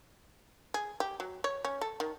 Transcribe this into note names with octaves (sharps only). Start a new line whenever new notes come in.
G#4
G4
F#3
C#5
C#4
A4
D#3